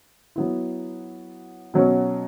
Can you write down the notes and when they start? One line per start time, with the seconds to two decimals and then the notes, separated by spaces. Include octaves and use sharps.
0.36 F#3 B3 E4
1.74 B2 F#3 C#4